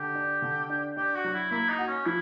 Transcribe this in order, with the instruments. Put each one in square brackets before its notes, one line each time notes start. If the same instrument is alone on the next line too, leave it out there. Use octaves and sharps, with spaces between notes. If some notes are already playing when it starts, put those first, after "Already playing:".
Already playing: [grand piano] D3 [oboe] G4
[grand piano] D4
D3
D4
[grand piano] D4 [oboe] G4
[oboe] F#4
[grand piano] F#3
[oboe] E4
[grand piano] A#3 [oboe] E4
[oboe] D#4
[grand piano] F#4
[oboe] C#4
[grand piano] F3 [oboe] E4